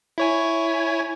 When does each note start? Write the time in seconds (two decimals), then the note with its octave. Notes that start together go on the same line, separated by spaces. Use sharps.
0.18 E4 C#5 G#5